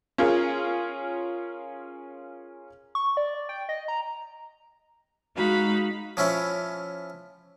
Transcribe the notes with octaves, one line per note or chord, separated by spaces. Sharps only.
C#4 F4 G#4 A#4
C#6
D5
G5
D#5
A#5
G#3 D#4 F#4 F5 B5
F3 C#4 E4 C#5